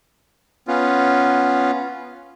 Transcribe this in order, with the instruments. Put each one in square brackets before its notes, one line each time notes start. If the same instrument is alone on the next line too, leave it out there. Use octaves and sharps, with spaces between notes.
[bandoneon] B3 C#4 F4